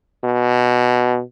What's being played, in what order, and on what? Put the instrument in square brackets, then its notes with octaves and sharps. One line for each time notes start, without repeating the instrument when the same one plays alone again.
[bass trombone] B2